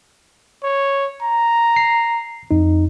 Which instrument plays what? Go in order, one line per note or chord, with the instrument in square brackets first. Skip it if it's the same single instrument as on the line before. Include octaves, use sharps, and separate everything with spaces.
[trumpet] C#5
A#5
[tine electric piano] C7
F2 D#4